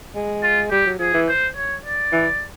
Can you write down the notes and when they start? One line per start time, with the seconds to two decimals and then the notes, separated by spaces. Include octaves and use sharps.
0.15 G#3
0.43 F4
0.71 G3 G4
0.86 F#3
0.99 F3 G#4
1.14 E3
1.28 C5
1.57 C#5
1.85 D5
2.12 E3